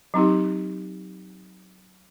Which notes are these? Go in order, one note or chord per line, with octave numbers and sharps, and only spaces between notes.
F#3 C4 D#4 G4